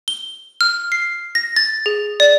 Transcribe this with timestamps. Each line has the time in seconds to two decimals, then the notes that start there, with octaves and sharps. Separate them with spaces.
0.08 G7
0.61 F6
0.92 C7
1.35 A#6
1.56 A6
1.86 G#4
2.20 D5